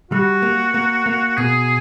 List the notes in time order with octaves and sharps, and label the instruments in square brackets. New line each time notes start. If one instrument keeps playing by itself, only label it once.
[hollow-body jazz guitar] G3 [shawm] F#4
[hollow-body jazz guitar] A#3
A#3
A#3
[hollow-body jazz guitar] B2 [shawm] G#4